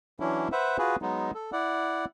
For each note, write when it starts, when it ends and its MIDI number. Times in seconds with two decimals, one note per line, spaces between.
0.20 0.48 52
0.20 0.48 54
0.20 0.48 61
0.20 0.48 62
0.20 0.48 64
0.52 0.77 71
0.52 0.77 72
0.52 0.77 76
0.52 0.77 78
0.78 0.96 65
0.78 0.96 66
0.78 0.96 68
0.78 0.96 71
1.02 1.31 54
1.02 1.31 56
1.02 1.31 59
1.02 1.31 63
1.34 1.51 69
1.52 2.05 64
1.52 2.05 74
1.52 2.05 78